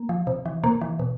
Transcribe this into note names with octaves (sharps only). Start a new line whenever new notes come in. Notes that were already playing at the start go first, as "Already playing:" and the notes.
Already playing: A#3
F3
C3
E3
C3 A#3
E3
B2